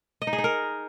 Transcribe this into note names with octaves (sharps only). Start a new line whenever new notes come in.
D#5
D#4
G#4
D#4
A#4